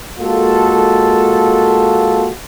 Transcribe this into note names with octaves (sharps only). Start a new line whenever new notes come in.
G#3 A#3 F4 F#4 A4